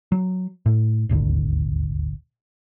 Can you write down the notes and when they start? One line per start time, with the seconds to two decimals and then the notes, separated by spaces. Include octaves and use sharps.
0.12 F#3
0.66 A2
1.09 D#1 G#1 D2